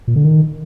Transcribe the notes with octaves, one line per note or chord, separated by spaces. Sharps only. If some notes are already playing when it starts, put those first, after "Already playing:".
A#2
D3
D#3